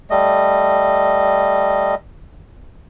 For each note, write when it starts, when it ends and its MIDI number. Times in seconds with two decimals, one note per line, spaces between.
0.10 1.95 55
0.10 1.95 57
0.10 1.95 75